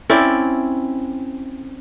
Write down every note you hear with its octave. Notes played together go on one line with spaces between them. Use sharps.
C4 C#4 E4 D5